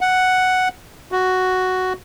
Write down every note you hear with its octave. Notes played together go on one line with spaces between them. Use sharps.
F#5
F#4